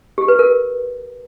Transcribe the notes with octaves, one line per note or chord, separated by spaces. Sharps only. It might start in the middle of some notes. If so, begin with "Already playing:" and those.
G4
B4
A#4